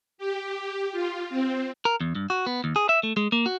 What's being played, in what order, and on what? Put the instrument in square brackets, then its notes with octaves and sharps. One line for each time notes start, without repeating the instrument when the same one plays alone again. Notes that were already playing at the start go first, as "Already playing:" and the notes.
[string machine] G4
F4
C4
[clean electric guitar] A#4
E2
G2
F#4
B3
D#2
G#4
E5
A3
G#3
A#3
F#4